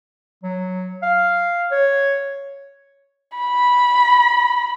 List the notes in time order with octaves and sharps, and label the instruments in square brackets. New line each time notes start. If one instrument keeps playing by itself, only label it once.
[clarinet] F#3
F5
C#5
[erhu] B5